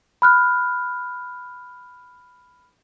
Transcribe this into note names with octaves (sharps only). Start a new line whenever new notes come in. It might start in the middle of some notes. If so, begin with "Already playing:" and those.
B5 F6 F#6